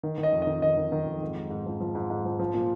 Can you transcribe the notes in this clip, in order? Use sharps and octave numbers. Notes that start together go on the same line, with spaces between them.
D#3
D#3
D#5
F2
D#5
D#3
D#3 D#5
D#3
D#3
F2
G#2
G#2
G#2
F3
F3
G#2
G#2
F3
F3
A#2